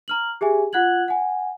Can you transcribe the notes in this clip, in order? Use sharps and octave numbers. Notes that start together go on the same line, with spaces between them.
A#5 F6 F#7
G4 G#4 E5 G#5
F4 F#5 F#6 G#6 F#7
F#5 G#5